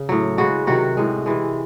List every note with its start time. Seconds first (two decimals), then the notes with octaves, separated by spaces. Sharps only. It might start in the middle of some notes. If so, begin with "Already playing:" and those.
Already playing: C#3
0.09 A2 F#3
0.38 C#3 G#3 F#4
0.67 C3 D#3 F#3 F#4
0.97 A2 G#3
1.26 C3 E3 G#3